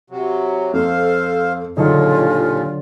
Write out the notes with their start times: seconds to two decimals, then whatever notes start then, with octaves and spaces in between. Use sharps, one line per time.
0.10 C3 F#3
0.73 F2 A4 C5 F5
1.77 D#2 A#2 D3 F#3 D#4 F4 G#4 A4